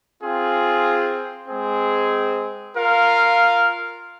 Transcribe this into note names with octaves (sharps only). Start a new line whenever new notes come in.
C4 F4 G#4
G#3 C4 G#4
F4 A#4 F5